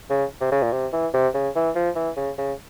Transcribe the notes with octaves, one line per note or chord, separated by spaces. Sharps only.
C#3
C3
C#3
A#2
C3
E3
C3
C#3
E3
F3
E3
C#3
C#3